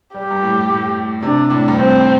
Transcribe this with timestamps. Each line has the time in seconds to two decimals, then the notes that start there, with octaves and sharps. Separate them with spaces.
0.14 G3 G4
0.31 G2
0.43 A2
0.70 A2
1.22 C3 D4
1.50 A2
1.68 G2
1.76 A2 C4